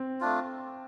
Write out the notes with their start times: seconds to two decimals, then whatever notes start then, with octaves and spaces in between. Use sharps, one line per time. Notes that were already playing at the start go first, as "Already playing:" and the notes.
Already playing: C4
0.20 A3 D4 F4